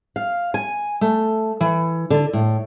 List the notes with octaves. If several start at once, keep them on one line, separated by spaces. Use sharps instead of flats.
F5
G#5
A3
E3
D3
A2